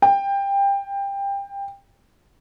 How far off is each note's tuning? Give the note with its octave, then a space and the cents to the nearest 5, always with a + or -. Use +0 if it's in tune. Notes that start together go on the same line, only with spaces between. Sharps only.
G5 +20